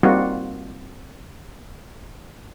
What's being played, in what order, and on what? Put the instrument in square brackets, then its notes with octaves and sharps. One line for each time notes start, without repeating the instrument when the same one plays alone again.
[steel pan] G3 A#3 C4 D#4 F4 F#4